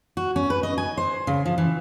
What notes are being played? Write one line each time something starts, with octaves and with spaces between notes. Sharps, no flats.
F#4
C#4
B4
D#5
G#5
C5
C#3
F3
E3